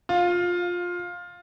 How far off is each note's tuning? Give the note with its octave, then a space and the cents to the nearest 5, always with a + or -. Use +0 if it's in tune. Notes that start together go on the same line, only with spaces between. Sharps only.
F4 +15